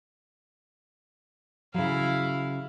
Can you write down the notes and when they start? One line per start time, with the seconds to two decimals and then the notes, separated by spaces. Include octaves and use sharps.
1.74 C#3 F#3 E4 F5